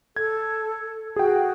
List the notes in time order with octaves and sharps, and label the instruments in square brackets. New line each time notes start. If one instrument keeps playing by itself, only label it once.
[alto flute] A4 [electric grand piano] G#6
[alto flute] F#4 [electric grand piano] G#4 G5